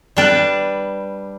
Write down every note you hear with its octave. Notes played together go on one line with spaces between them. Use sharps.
G3 D4 B4